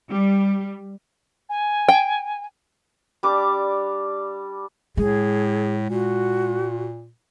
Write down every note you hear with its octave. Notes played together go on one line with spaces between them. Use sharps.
G3
G#5
G5
G3 D4 D6
A2 G#3 G#4
A#2 F#4